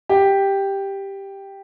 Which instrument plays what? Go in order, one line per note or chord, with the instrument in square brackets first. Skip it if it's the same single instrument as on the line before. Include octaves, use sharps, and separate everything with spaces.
[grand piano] G4